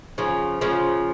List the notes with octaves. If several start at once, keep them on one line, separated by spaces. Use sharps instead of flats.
C#3 F3
C#3 F3